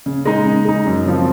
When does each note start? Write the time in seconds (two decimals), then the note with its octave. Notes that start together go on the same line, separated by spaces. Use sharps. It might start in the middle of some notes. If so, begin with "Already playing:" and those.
0.06 C#3
0.25 G#3 D#4
0.46 C#3
0.65 G#3 D#4
0.86 F#2
1.06 C#3 F3 C4 F4